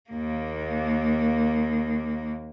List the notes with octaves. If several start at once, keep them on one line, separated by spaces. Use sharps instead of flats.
D#2 A#3